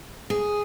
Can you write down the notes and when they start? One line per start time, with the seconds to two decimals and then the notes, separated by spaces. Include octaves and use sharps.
0.30 G#4